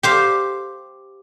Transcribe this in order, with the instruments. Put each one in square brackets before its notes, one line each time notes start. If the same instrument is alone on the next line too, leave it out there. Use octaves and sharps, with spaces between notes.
[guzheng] G4 C5 F5